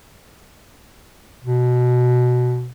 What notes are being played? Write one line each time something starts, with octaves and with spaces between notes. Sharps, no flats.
B2